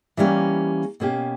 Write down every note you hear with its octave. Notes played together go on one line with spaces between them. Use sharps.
E3 G3 A#3 C#4 G4
B2 A#3 C#4 G4